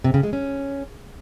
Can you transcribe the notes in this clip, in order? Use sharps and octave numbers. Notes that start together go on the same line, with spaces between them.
C3
C#3
G#3
C#4